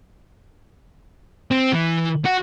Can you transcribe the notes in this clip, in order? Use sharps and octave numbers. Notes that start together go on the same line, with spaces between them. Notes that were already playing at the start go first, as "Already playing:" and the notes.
C4
E3
F#4